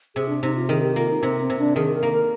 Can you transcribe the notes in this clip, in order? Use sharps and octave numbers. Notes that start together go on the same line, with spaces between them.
C3 G#4
D4
C3 D#4
F4
D#3 G#4
G4
A#3 F4
D#4
C3 C4
C4
C3
D4
D#3 G#4
A#4
A#3
A#4